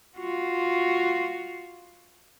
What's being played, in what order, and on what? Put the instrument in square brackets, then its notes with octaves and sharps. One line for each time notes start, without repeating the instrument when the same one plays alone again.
[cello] F4 F#4